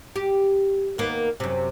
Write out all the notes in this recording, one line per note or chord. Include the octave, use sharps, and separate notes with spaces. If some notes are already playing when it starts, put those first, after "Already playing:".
G4
D#2 A#3 B3
F#2 C3